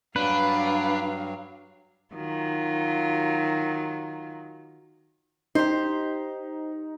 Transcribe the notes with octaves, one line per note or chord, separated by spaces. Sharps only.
G2 F#3 D4 B4 F5
D#3 F#3 F4
D#4 G4 C5